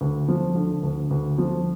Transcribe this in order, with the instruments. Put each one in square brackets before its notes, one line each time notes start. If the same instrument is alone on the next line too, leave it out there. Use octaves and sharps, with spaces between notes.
[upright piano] D2
F3
D3
D2
D2
F3